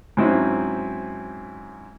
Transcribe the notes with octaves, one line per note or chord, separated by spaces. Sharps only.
G#2 F#3 C4 C#4 D#4 E4